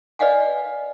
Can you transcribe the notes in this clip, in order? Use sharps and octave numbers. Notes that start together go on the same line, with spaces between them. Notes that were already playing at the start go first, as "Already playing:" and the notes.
B4 D5 D#5 F5 F#5 G#5